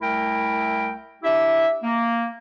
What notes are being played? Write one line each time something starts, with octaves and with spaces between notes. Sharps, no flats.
C2 A3 E4 A#4 G5
D4 E4 G4 E5
A#3